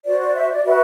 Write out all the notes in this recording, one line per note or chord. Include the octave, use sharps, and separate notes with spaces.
F#4 C5 D5
D5
E5
D5
F#4 B4 E5